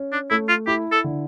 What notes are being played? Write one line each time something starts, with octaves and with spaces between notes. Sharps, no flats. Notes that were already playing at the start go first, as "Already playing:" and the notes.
Already playing: C#4
D4
A3 E4
F4
E4 G4
A4
D3